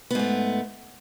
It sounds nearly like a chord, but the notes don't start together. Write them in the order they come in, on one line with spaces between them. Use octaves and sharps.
B3 G#2 A3